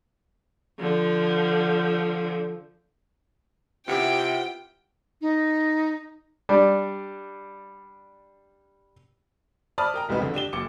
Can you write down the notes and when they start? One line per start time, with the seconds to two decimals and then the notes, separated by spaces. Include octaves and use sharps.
0.79 D3 F3
3.88 C3 B3 E4 F4 G4 G5
5.21 D#4
6.49 G3 D4
9.78 C5 D5 A5 B5 D#6 F6
9.94 A#4 G5 A#5
10.09 E1 C2 G#3 B3 D#4 B4
10.21 F2 D3
10.34 D4 G4 E7 G7
10.53 F#1 D6 C#7